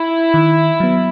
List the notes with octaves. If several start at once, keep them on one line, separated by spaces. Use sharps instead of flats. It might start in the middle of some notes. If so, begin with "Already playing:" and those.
Already playing: E4
D#3
F#3 B3